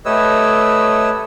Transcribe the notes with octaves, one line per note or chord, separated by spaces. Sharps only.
A3 G4 B4 C#5 D#5 E6